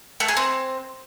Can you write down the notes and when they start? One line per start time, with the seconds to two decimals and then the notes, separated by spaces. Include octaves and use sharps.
0.20 A3
0.28 G#4
0.37 C4